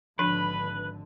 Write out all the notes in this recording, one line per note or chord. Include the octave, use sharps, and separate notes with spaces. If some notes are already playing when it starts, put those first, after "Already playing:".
G#1 D3 F3 D4 B4 B5